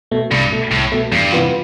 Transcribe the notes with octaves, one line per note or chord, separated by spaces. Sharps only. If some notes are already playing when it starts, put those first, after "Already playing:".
B2 A3
C2 G2
B2 A3
C2 A2
B2 A3
E2 G2
C3 E3 B3 F4